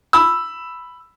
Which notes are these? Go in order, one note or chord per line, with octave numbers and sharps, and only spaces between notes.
B5 E6